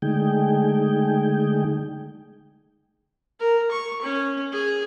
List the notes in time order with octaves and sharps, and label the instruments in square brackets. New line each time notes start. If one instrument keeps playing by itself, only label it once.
[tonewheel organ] D3 G#3 A3 D#4 G#4 G5
[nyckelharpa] A#4
C#6
C#4
G#4